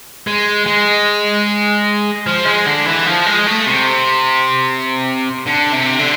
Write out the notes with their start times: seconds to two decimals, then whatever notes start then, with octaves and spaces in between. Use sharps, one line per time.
0.27 G#3
0.66 G#3
2.26 F3
2.46 G#3
2.66 D3
2.86 E3
3.06 F3
3.26 G#3
3.47 A3
3.66 C3
5.46 D3
5.72 C3
5.99 D3